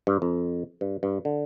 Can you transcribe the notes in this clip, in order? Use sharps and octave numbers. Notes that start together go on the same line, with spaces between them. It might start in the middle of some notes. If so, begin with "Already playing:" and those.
G2
F2
G2
G2
D3